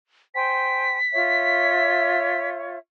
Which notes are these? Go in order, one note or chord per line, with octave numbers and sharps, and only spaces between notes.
C5 G5 G#5 B6
F4 C#5 E5